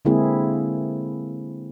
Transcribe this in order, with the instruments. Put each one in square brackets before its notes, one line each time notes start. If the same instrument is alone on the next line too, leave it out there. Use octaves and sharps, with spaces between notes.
[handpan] D3 G#3 A#3 C4 E4 G#4